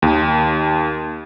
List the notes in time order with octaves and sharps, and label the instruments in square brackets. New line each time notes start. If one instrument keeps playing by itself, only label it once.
[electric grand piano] D#2